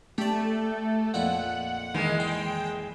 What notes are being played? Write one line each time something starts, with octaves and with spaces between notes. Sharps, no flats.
A3 G4 D5
F2 A#2 E4 F#5
D#3 E3 G#3
G5